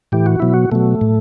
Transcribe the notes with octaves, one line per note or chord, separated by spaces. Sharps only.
A2 E3 G4
F#4
B2 F#3 E4
F#4
B2 F#3 A3
A2